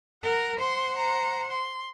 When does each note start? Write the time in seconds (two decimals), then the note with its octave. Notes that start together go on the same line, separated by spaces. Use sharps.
0.23 A#4 F#5
0.60 C5 F#5 C6
0.98 A#5
1.51 C6